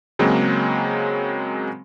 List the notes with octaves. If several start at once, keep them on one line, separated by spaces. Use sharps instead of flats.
C#3 F#3 G#3 A#3 C4